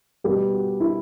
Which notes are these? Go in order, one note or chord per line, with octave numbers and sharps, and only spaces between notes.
B2 G3 G4
F#4
E4